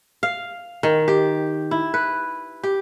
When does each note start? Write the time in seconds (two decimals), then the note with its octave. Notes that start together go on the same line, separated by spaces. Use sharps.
0.23 F5
0.83 D#3
1.08 G4
1.71 E4
1.94 B4
2.63 G4